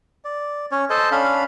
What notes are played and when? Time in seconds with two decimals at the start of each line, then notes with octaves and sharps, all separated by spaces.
0.25 D5
0.72 C#4 C#5
0.90 A4 C5 D#5 A5
1.12 C#4 D4 F5 B5